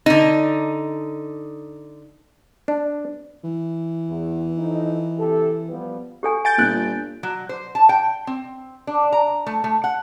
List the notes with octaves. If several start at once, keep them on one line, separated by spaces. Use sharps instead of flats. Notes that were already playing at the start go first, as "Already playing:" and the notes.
D3 D#4
D4
E3
E2
F2 D#4
C3 G4 A4
F3 G3 B3
G4 A4 G#5
G#5 G6 A6 D7
G1 A#2 F#6
F#3
C5
A5
G5
C4
D4
A#5
A3
A3
F#5